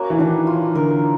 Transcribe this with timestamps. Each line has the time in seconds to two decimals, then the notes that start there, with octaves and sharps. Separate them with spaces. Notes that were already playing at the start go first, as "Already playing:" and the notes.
Already playing: A#3 C#4 F#4
0.10 E3
0.19 D#3 D4
0.47 F4
0.75 D3 A#4